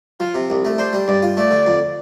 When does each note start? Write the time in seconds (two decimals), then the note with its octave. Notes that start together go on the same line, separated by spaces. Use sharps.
0.20 F3 F4
0.35 C3
0.50 C2
0.65 A3
0.78 D4 C5
0.93 G3
1.08 G2 D5
1.22 F4
1.37 A3 D5
1.51 D3
1.67 F2